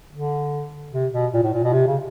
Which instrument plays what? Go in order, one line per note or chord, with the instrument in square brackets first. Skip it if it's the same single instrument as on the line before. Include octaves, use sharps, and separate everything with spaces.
[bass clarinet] D3
C3
B2
A#2
A2
A#2
B2
C3
C#3